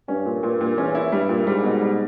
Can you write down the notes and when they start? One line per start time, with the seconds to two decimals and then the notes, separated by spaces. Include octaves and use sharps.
0.08 G2 C#4
0.25 A#2
0.43 G2 A#2
0.61 A#2
0.77 E2 C#4
0.95 E4
1.12 G2 G3
1.29 A#2
1.47 G#2 G3
1.64 B2
1.82 G3